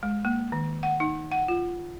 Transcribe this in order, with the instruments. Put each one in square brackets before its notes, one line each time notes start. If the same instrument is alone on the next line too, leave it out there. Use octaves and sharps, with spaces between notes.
[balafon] G#3
A#3
D#3
F#5
D#4
F#5
F4